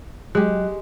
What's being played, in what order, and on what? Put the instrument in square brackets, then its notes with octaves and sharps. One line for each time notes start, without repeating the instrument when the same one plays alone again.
[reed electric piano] F#3 D#5 F#6 [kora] G#3 G4